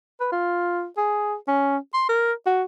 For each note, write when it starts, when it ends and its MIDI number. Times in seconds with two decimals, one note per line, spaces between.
0.20 0.28 71
0.32 0.86 65
0.97 1.35 68
1.48 1.77 61
1.94 2.08 84
2.09 2.32 70
2.46 2.64 66